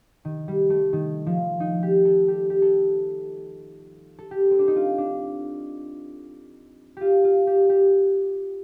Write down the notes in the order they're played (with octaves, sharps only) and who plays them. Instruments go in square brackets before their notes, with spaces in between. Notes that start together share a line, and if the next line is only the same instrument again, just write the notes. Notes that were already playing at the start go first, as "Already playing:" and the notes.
[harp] D#3
G3
A3
D#3
F3
D#4
G4
A4
G4
G4
A4
A4
G4
C4
D4
D#4
F4
D4
F4 G4
F4
G4
G4